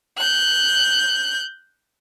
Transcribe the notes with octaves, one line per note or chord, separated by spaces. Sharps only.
F#6 G6